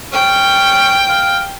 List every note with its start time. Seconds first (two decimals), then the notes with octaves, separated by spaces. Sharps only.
0.13 C#4 G5
1.09 F5